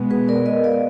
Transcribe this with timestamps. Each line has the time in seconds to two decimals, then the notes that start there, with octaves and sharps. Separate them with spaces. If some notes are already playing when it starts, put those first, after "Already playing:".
Already playing: B2 G#3 B3
0.10 G#4 B4
0.28 A#4 D5
0.46 B4 D#5
0.64 D5 F5